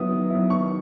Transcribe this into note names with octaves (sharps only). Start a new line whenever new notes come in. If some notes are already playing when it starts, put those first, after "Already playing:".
Already playing: D#3 F#3 B3 E4 D#6
D#3
F#3 B3 E4
D#3 C#6